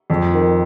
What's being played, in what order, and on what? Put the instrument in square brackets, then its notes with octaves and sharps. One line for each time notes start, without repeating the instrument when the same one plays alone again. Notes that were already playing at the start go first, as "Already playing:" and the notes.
[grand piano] F2
D#3